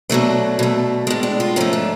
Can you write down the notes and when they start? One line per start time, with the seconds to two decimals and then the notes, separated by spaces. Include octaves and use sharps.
0.10 B2 F#3 A3 D4
0.59 B2 A3
1.07 A2 G#3 D4
1.23 D4
1.40 F4
1.56 G#2 F3 A3 C#4
1.73 D4